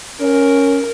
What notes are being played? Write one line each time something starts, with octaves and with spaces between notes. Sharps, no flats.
C#4 A#4